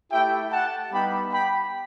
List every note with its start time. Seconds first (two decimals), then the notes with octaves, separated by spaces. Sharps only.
0.11 A3 E4 G4 E5 G5
0.52 F#5 A5
0.92 G3 B3 D#4 G4 G5 B5
1.33 G5 B5